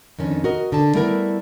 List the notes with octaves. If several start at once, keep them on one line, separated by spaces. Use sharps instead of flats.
F2 D#3 C#4 D4
F#4 A#4 D#5
D3 A5
G3 A3 B3 E4 A#4